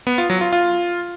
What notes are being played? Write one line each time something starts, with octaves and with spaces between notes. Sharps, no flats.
B3
F4
F#3
F4
F4